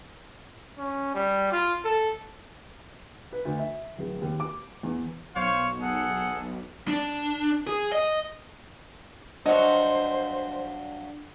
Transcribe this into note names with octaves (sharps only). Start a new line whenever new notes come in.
C#4
G3
F4
A4
B4
D2
E5
D1
D#2
D6
E2
B1 C5 C#5 F5
G#4 A4 F#5
D4
G#4
D#5
G2 F#3 D4 C5 D#5